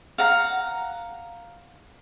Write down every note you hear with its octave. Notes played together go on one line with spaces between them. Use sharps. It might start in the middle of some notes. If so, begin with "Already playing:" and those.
F5 F#5 A#5